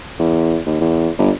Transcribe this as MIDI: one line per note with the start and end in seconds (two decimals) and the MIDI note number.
0.19 0.59 40
0.66 0.79 39
0.81 1.09 40
1.19 1.32 31